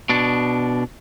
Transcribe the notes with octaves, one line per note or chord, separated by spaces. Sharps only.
B2 D4